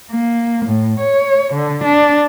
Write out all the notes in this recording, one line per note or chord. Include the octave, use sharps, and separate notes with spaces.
A#3
A2
C#5
D3
D4